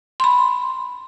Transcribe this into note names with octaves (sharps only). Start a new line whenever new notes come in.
B5 C6